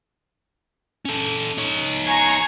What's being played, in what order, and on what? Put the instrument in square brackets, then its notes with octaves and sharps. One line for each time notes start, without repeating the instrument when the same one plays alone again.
[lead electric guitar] C#4 A4
D#4 C#5
[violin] G#5 G#6 [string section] A#5 C#6 C7